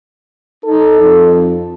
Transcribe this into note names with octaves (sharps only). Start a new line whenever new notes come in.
D#4 A4
F2